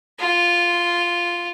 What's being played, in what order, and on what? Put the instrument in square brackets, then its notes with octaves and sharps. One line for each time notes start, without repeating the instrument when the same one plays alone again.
[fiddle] F4